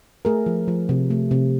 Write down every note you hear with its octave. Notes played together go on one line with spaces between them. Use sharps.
A3 G#4 A#4
F3
F3
C3
A3
C3